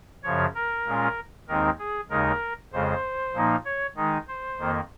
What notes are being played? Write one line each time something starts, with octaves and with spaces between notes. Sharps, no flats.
F#2 C#3 F3 C#5
A#4
A#2 G#3 C#4 F4
D#2 D#3 G#3 C4 D#4 A#4
G#4
D#2 C#3 G#3 D#4 A#4
F2 C#3 G#3 C5
A#2 F3 A#3 D#4
C#5
D#3 G#3 D#4
C5
F2 D#3 A#3